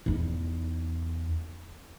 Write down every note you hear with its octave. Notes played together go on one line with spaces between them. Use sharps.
E2 D#4